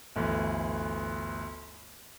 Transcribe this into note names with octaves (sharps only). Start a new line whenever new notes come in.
G1 D2 E3